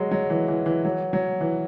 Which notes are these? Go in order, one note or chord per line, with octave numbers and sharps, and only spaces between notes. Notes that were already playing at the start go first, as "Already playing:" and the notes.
Already playing: F#3 G#3
F#3
E3
E3
E3
F#3
F#3
E3